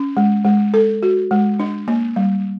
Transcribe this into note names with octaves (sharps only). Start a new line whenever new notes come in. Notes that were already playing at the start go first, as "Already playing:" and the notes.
Already playing: C#4
G#3
G#3
A4
F#4
G#3
D4
A#3
G3